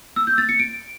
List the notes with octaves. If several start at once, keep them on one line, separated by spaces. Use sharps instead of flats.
E6
G6
A6
C#7
D7